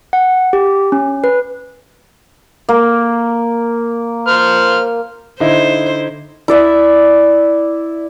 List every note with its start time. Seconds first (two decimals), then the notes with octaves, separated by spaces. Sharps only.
0.13 F#5
0.53 G4
0.92 C#4
1.24 B4
2.69 A#3
4.27 C5 F6
5.40 D3 D#4 E4 C5
6.48 E4 D5 E5